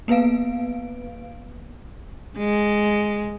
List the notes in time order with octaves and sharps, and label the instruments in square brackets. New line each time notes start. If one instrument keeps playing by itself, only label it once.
[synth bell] A#3 B3 B4 F5 D7
[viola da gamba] G#3